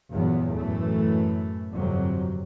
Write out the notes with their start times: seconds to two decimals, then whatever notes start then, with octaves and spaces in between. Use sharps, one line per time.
0.13 E2 G2 A#2 F#3 B3
0.57 F#2 A2 E3 A3
1.74 G1 F2 C3 F#3